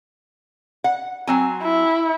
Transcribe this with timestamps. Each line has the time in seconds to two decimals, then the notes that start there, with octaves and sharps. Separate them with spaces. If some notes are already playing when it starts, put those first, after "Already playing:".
0.84 F#5
1.27 F#3 C4 G#5
1.62 E4